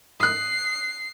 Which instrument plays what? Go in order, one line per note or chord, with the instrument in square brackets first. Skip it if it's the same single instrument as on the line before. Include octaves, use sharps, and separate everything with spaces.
[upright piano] D#6 F#6 [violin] C7